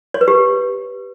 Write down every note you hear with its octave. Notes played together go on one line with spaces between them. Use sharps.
C#5
B4
G4